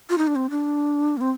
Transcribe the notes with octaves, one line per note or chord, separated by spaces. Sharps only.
F4
D#4
D4
C4
D4
A#3
C4